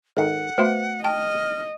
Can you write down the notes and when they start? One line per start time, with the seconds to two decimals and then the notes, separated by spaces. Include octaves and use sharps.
0.17 G#1 D#3 A4 F#5
0.58 A3 B3 F#4 C5 E5
1.04 D#5 G5 A5 F6